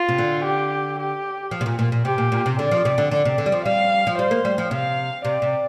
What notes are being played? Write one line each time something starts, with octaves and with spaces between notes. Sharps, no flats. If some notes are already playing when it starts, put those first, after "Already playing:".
Already playing: F4
C3
D3
G4
G4
F3
C3
A#2
A#2
A#2
C3 G4
A#2
A#2
C3
D3 D5
F3
C3
D3
D3 D5
C3
D3
G3
F3
G3 F5
F3
G3 C5
A#3
G3
F3
C3 F5
C3 D5
C3